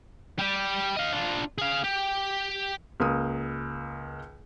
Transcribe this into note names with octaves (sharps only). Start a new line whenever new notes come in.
G3 G4
D#5 F5
D4 F4
G#4 F5
G4
C#2 A#3 D#6